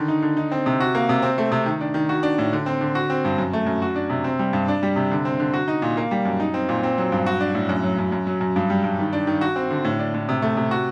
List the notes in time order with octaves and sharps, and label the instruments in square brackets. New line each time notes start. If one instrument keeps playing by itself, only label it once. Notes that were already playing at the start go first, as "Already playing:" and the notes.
Already playing: [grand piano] D3 D#3
D#4
D3
D#4
C4
C3
F#4
A#3
C3
C4
A3
C3
D#3
D4
D#3
F#4
D4
A2
D3
C4
D3
F#4
C4
G2
F#2
A3
F#2
F#4
D4
C3
C4
G3
G2
D4
G3
C3
D3
C4
D3
F#4
D#4
A#2
A#3
G3
F#2
D#4
C4
A#2
C4
F#3
G2
F#4
D4
A2
F#2
F#3
F#2
F#2
F#3
F#2
G2
G3
G2
D#3
D4
D#3
F#4
C4
D3
A2
D4
A2
C3
A3
C3
F#4